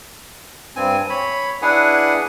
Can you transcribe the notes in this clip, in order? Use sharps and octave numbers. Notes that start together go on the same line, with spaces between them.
G2 C4 G#5
C#5 B5
D4 E4 G#4 B4 F#5 G#5